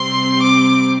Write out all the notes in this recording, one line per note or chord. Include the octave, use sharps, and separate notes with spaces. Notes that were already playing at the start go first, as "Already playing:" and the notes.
Already playing: C3 G3 C4 C6
D6